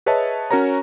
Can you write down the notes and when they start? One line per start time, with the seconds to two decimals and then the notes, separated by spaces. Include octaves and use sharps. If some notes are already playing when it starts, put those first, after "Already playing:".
0.06 G#4 B4 C#5 D#5 E5 A5
0.51 C#4 F#4 A#4 C#5 A#5